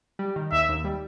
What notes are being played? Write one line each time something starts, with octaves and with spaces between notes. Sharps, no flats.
G3
D#3
D#2 E5
D#2
G3